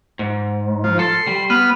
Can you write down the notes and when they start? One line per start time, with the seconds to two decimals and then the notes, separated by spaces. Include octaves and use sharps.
0.19 G#2
0.84 F3
0.99 A4 C6
1.27 G3
1.50 B3 B4 F6